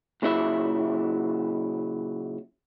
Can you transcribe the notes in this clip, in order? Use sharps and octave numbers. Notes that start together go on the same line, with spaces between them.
A#2 C#3 F#3 E4 B4 E5